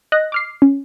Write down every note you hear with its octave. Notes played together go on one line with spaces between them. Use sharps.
D#5 F#6 A#6
D6 F6 C7
C#4